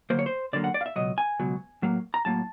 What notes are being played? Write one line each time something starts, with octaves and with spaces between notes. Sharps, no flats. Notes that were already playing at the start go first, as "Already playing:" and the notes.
D2 D3 F#3 A#3 C5
C#5
C5
D2 D3 F#3 A#3 D5
F#5
D5
F5
E5
C#2 B2 F#3 D#5
G#5
C#2 B2 F#3
A2 F#3 A#3
A#5
A2 F#3 A#3 A5